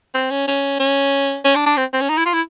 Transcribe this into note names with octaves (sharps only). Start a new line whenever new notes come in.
C4
C#4
C#4
C#4
C#4
D4
D4
C4
C4
C#4
D#4
E4
F4
E4